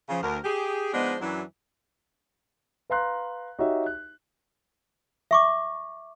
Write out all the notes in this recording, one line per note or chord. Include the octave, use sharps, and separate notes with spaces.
C#3 F3
D2 A#4
G4 G#4
F3 G#3 B3 D4 D#4 C5
F#2 E3 F#3 D4 E4
B4 F5 A#5 C6 F#6
D#4 F#4 G4 C#5 E5
F#6
E5 C#6 D6